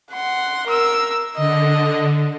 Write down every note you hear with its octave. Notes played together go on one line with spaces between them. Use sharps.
F#5 C6
A#4 E6
D3 D#5